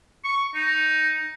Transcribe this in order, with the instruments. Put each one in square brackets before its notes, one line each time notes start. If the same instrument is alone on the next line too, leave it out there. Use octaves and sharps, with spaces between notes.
[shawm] C#6
D#4